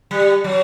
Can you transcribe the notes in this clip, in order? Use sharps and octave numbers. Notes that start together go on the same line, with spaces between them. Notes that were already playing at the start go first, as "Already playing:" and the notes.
G3
F#3